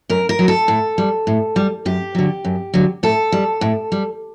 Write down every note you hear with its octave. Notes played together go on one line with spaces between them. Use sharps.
F#2 A#4
A#4
F#3
A4
A2
G3
A2
G3
F#2 G4
D3 F#3
F#2
D3 F#3
A2 A4
G3
A2
G3